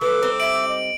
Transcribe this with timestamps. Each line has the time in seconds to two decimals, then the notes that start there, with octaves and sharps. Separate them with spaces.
0.01 F2 D3 A3 B4 D6 E6
0.22 G3 C4 D#4
0.40 E5 D7 F#7
0.68 D#5